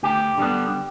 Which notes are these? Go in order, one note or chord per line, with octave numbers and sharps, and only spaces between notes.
D2 G4
D3 G3 B3